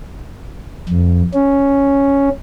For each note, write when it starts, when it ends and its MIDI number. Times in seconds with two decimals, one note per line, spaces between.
0.89 1.22 41
1.34 2.29 61